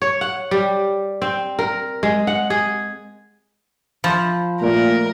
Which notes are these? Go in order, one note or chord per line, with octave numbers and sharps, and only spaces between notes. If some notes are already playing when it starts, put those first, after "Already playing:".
C#5
F#5
G3
C4
A#4
G#3
F#5
G#4
F3 B5 C6
A#2 A3 A#4